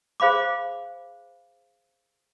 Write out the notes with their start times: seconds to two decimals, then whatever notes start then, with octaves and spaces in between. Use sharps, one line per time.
0.20 G#4 C5 F5 B5 D6